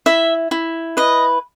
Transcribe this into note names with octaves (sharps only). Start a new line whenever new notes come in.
E4 E5
E4
B4 D#5